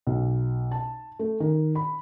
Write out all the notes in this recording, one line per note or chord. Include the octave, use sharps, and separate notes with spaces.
B1
A5
A3
D#3
B5